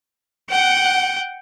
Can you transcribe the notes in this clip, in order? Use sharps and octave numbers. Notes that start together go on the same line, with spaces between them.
F#5 G5